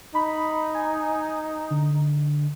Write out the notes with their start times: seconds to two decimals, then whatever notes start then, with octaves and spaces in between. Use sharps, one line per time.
0.15 D#4 B5
0.75 G#5
1.70 D3